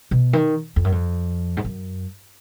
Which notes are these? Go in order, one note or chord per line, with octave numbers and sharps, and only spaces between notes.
B2
D#3
F2
F#2
F2
G#2
F#2